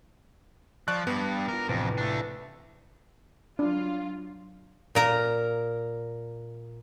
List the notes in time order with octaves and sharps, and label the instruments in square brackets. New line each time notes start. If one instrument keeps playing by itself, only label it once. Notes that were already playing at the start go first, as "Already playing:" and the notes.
[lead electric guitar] F3 [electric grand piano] D5 C#6 F#6
[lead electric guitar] G2 [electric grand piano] B3
[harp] D4 F4 [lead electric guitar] A#4
[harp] A1 C3 D7 [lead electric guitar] F2
[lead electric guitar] A3 D4
[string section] F#3 F4 [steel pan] D4
[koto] A#2 A#4 A#5